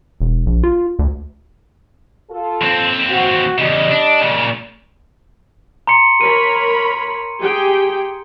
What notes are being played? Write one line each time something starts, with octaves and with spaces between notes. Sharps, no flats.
E1
A#1
F4
D2
F4 A4
D#2 C4
F#4
E2 C#3 G3 D#5
D4
A#2 C#3
A#5 C6 C#7
A#4 C#5 B5 D#7
G4 G#4 G5